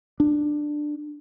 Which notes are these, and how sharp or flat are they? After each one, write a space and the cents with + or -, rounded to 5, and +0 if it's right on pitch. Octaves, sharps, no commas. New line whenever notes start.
D4 +15